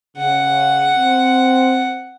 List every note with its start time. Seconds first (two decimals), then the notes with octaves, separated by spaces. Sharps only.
0.17 C#3 F#5
0.96 C4